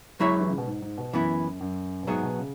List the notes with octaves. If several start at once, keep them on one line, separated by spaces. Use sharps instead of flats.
F#2 F#3 G#3 E4 C#5 E5
E3
C#3
B2
G#2
G#2
B2
F#2 E3 B3 E4
F#2
B2
G#2 F#3 B3 G#4 E5
B2
C#3